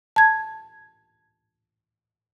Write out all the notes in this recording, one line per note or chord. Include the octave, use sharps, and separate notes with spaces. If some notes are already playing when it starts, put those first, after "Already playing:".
A5 G#6